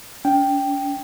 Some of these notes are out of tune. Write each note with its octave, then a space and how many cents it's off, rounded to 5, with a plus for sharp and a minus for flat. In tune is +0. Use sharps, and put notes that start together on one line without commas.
C#4 +45 G5 +0